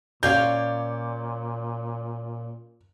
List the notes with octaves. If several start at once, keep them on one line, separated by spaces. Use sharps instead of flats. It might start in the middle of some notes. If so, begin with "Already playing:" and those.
A#2 C#4 C#5 D5 F5 G#5 G6